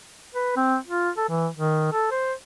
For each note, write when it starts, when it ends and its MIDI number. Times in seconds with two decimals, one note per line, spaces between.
0.35 0.56 71
0.56 0.77 60
0.88 1.10 65
1.17 1.27 69
1.29 1.48 52
1.55 1.90 51
1.93 2.07 69
2.11 2.33 72